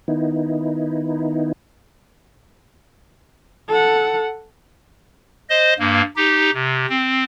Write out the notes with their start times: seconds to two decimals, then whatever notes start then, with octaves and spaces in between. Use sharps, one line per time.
0.08 D#3 B3 D#4 E4
3.68 A4 F#5
5.50 C5 D#5
5.79 G2 A#3
6.16 D#4 G4
6.54 C3
6.89 C4